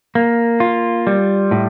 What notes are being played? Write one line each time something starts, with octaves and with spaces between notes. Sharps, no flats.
A#3
F4
G3
A2